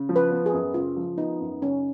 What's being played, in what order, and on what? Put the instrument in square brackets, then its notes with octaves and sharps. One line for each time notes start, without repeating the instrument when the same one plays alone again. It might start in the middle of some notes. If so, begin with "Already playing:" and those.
Already playing: [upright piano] C#3
F3
[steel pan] B4
[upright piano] B3
[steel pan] G#4
[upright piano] F#2
[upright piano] C#3 [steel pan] F4
[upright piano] F3
[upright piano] B3 [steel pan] D#4
[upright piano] F#2
[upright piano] C#3 [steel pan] C#4